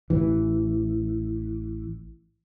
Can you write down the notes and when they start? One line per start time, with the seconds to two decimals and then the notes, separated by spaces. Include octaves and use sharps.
0.10 A1 E3